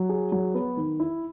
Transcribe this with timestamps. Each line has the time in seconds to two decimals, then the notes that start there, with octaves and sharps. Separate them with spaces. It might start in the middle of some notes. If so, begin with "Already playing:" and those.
Already playing: F#3
0.09 G#4
0.32 F#3
0.55 B3
0.77 D#3
1.00 E4